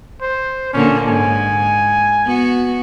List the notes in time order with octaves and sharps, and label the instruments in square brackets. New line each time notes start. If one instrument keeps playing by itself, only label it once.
[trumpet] C5
[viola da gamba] A#2 D3 A#3 [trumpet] C#4
[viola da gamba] G#2 [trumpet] G#5
[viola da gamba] B3 F#4